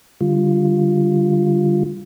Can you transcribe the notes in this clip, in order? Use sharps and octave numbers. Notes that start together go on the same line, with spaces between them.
D3 G3 F4